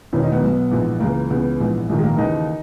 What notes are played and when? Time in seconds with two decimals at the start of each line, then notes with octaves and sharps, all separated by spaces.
0.13 E1 E2 D#3 C#4
0.23 D#4
0.32 B3
0.43 B1 B2
0.71 A#1 G#2 E3
1.00 C#2 C#3 E3 A#3
1.30 C#2 C#3 E3 B3
1.60 A#1 G#2 E3
1.89 A#1 G#2 D#3
1.99 G#3
2.03 A#3
2.17 D#2 C#3 E3 D#4